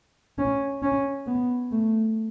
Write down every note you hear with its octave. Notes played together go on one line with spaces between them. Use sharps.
C#4
C#4
B3
A3